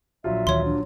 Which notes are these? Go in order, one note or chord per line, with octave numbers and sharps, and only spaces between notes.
A#1 F#3 F4 E5
D2 D#3 E3 C#5 C6
D4